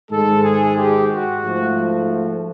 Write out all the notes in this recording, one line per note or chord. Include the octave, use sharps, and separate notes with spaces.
G#2 D#3 G#3 A4
G#4
G4
F#4
G#2 F3 A3